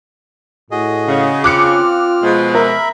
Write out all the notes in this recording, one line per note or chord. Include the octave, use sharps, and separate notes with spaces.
A2 F#4 G#4 D#5
C#3
C4 F4 D6 F6 F#6 C#7
B2 F3 G#3
A#4 E5 B5